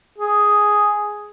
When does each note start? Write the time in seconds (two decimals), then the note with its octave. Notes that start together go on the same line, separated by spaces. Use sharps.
0.18 G#4